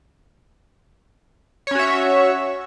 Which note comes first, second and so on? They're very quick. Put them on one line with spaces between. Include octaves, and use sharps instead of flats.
C#5 C#4 F#4 E5